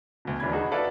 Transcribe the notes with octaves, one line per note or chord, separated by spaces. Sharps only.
D2 B2
D#2 E3 D4 B5 G#6
D#4 F#4 G#4
F#4 A4 B4 D5 E5 F5